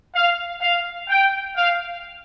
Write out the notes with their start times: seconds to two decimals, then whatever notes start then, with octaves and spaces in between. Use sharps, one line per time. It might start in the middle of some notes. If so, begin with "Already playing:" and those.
0.14 F5
0.62 F5
1.09 G5
1.56 F5